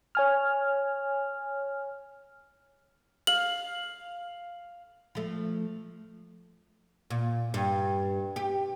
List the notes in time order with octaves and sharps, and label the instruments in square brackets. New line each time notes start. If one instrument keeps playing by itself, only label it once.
[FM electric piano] C#5 G#5 F6
[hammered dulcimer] F5 [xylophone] F#7
[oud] F3 A3
A#2
G2
G4